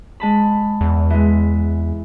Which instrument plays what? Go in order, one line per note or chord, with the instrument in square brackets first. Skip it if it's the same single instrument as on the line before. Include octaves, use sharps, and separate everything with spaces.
[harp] G#3 A5 B5
[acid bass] E2
[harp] E3 G#3